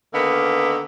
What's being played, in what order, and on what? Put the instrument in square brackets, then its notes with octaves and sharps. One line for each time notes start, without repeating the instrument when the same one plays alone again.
[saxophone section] D3 D#3 A#3 B3